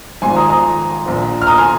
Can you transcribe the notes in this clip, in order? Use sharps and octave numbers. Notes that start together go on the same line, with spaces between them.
G#1 G#2 F3 G#5 C6
A#5 D#6
A#5 D#6
A#1 A#2 F3
F6
A#5 D#6
G#5 C6